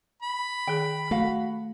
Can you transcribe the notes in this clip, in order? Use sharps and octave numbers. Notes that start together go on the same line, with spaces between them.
B5
D#3 G#4 G5
A3 F#4 F5 F#5